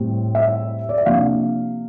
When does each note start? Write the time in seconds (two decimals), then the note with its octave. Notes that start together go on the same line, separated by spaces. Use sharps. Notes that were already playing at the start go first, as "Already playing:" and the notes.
Already playing: A2 G3 C4
0.35 E5
0.89 D5
0.98 E5
1.06 C3 F3 A#3 D4 F5